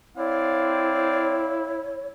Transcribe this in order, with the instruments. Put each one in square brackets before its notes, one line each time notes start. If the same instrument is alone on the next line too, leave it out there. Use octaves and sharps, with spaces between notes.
[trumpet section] C4 D5 F5 [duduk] E4 [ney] C#5